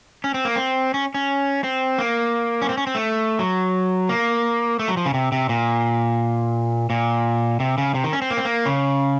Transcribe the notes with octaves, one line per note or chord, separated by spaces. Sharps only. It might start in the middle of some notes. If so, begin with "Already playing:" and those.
C#4
C4
A#3
C4
C#4
C#4
C4
A#3
C#4
C4
C#4
C4
A3
F#3
A#3
A3
F#3
F3
C#3
C3
C3
A#2
A#2
C3
C#3
C3
D#3
C#4
C4
A#3
C4
A#3
C#3